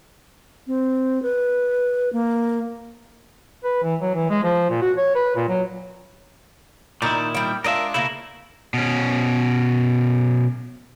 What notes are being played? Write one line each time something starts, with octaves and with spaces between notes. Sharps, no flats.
C4
B4
A#3
B4
E3
F#3
E3
G#3
F3
A#2
F#4
C#5
B4
A#2
F#3
A#2 D#3 D#4 E4 D5 A#5
G3 G5
G#3 D4 F4 A#4 D#5 E5
C#3 A3 A#3 E4 A#4
B2 C#4